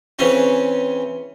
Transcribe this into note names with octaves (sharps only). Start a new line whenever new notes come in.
C#3 E3 C4 C#4